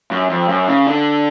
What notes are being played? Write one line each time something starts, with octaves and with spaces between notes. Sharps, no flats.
F#2
F2
F#2
C#3
D3